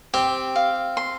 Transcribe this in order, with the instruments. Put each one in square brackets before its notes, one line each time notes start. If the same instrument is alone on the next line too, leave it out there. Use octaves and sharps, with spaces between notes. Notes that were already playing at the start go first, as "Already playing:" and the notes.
[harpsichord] C4 [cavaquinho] G4
[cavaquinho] F5
C6